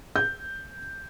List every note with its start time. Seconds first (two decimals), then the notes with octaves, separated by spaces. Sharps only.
0.16 G6